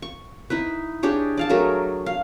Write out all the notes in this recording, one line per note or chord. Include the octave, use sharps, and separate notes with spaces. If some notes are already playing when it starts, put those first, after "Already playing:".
C#6
D#4 E4 B4
D4 G4 G#4 C#5
D5 F5 A5
F#3 A3 G#4 A#4
F5